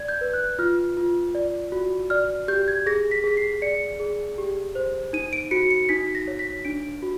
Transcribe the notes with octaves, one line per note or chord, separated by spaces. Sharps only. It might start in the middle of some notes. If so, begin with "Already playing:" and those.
Already playing: D5 G#6
G6
B4
F#6
F4 F6
F4
D5
F#4
D5 F6
G4 G6
G#6
G#4 A#6
B6
G#4 B6
C7
D5 C#7
G#4
G4
C5
D#4 D#7
D7
F#4 C#7
C#7
D#4 B6
A#6
C#5
B6
D4 D7
F#4